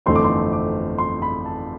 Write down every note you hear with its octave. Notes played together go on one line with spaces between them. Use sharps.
G1 F2 E3 A3 C4 C6
D6
C6
D6
C6
B5
A5